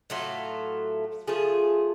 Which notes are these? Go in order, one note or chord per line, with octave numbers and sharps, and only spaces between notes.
A2 F#3 A3 F4
F3 A3 F4 G#4